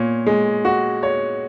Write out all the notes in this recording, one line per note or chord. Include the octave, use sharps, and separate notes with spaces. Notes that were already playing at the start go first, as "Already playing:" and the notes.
Already playing: A#2 C#5
G#3
F#4
C#5